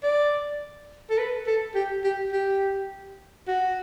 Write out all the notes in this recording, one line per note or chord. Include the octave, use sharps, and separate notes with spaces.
D5
A4
B4
A4
G4
G4
G4
F#4